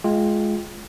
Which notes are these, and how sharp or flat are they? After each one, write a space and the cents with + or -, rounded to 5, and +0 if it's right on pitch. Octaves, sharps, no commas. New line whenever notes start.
G#3 +20 F4 +0 G5 +0